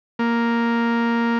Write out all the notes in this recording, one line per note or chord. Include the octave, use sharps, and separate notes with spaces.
A#3